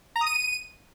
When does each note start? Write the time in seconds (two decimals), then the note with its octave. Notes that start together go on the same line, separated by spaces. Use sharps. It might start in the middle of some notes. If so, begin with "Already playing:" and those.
0.16 A#5
0.21 D#6
0.26 D#7